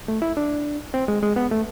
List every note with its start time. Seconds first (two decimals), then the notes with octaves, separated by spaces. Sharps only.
0.08 A3
0.22 E4
0.37 D4
0.94 C4
1.08 G#3
1.22 G#3
1.36 B3
1.51 A3